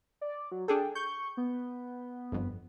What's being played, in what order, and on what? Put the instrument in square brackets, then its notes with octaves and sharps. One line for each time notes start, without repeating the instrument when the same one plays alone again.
[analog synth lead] D5
F#3
[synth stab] D4 G#4 A4 [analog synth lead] G5
[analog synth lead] C#6 [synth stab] G6
[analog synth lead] B3
[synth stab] G1 F2